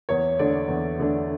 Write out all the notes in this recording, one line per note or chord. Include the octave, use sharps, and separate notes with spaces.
E2 C#5
D3 A3 D4 D5
E2
D3 A3 D4